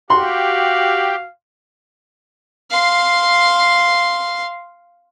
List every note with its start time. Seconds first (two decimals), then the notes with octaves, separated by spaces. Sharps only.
0.10 F#4 G4 F5 C6
2.71 F5 C6